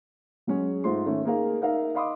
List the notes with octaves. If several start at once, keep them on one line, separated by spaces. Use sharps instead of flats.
F#3 G#3 C#4 G#4
G#2 A3 F4 C5 C6
D#3 A3 C#4
A#3 D#4 G#4 A#4 F5
D#4 A#4 E5 F5
D#5 F5 B5 C6 D6 D#6